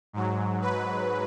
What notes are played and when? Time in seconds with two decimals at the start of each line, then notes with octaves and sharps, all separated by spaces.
0.13 G#2 F#3
0.62 B4